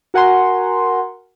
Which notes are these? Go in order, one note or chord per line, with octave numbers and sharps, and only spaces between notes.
F#4 A#4 F#5 G#5 A#5 C6